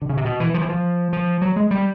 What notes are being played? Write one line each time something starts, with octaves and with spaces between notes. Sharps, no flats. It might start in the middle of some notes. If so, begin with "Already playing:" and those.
D3
C#3
C3
B2
E3
F3
E3
F3
F3
F#3
G#3
G3